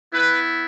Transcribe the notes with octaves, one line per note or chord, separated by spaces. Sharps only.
B3 E4 B4